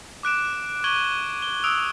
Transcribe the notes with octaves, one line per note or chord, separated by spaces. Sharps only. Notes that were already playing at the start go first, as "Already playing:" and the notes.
D6 F#6 D7 E7
C#6 D6 G#6 D#7 F#7 G7
G7
D#6 E6 F#6 D7 F7